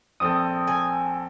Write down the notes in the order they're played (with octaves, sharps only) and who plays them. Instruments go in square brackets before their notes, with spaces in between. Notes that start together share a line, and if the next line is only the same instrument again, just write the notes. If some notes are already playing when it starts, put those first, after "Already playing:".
[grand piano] A#1 C4 A4 [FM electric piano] D#6
[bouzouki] G#5